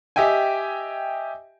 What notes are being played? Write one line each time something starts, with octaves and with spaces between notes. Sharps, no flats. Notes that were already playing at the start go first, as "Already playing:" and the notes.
G4 D#5 E5 G5 G#5